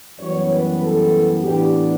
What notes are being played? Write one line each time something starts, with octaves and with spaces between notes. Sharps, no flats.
F#2 E3 G3 B3 C#5
B4
A4
A2 E3 B3 D4 G4